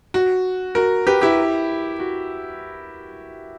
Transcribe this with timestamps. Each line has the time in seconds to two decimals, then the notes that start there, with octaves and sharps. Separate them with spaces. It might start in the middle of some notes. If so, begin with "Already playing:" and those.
0.14 F#4
0.75 F#4 A#4
1.07 G4 B4
1.22 E4 G4
2.00 F#4